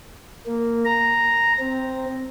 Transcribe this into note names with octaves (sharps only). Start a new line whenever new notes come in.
A#3
A#5
C4